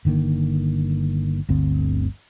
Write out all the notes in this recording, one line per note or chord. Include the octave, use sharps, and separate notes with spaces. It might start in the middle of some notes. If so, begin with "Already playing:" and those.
G1 D3 D#3 A#3
G1 D2 C4